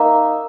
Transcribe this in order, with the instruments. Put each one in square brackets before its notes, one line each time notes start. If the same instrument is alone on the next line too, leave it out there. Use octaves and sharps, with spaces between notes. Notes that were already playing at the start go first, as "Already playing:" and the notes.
Already playing: [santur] A#3 D#4 E5